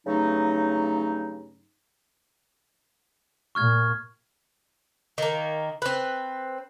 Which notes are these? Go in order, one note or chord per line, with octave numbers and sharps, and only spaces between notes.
G2 C#3 F#3 A3 D#4
A#2 C#6 F6 G#6
D#3 A#3
C4 B4